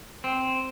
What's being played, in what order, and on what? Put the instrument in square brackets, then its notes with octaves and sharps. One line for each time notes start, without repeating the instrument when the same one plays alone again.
[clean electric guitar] C4